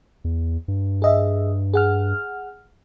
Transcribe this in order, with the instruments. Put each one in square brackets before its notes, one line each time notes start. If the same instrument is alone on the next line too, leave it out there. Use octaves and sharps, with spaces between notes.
[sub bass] E2
G2
[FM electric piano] G#4 D#5 E5
G#4 F#5 F6